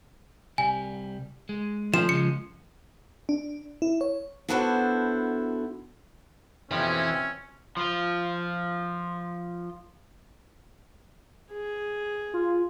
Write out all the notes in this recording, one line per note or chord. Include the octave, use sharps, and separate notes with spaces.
C2 G3 G#5
G#3
F3 A3 C#4 D4 E7
C#3 G#3 C#7
D4
E4
C#5
B3 D4 E4 F#4 A4 C5
F2 B2 E3 F3 C4 C#4 G4 E5
F3 F4
G#4
F4